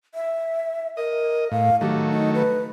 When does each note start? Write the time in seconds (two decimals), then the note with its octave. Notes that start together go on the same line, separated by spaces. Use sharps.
0.15 E5
0.97 A#4 D#5
1.51 A2 F5
1.81 D#3 F#3 A3 G4
2.10 D#4
2.34 B4